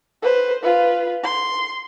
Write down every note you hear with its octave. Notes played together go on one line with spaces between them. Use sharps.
B4 C5
F4 B4
C6